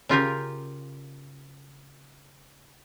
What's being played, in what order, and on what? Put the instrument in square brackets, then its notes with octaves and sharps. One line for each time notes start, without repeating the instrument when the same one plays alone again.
[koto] C#3 F4 G4 A#4